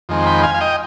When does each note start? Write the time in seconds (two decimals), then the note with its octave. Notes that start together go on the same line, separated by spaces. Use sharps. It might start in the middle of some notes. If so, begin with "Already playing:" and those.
0.09 F2 D#3 G#3 C4
0.26 G5 B5
0.43 F5 G#5
0.54 F5
0.61 D#5 G5